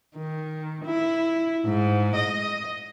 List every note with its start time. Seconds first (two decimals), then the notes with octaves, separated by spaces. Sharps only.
0.16 D#3
0.85 E4
1.66 G#2
2.16 D#5